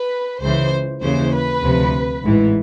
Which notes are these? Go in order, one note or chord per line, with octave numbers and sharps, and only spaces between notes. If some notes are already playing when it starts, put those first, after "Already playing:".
Already playing: B4
C#2 C#3 E3 C5
D#2 C#3 E3 C5
B4
D2 C3 F3
A1 G#2 E3